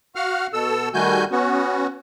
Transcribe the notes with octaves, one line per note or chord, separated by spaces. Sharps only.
F#4 F5 F#5 F6
B2 A4 E6
D#3 G3 A3 F#4 G#5 G6
B3 C#4 F#4